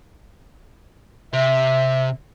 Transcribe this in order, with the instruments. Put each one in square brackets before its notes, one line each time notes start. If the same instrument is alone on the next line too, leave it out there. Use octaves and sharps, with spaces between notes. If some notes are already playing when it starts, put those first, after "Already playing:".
[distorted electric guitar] C3 [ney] E5